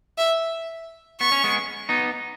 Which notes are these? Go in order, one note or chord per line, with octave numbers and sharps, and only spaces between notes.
E5
B3 C#6
C#4
G#3 B3
B3 D#4